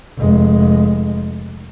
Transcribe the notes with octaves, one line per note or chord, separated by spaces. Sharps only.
F1 G#3